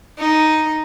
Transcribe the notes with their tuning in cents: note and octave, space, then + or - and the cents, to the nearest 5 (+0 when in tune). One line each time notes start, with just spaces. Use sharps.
D#4 +0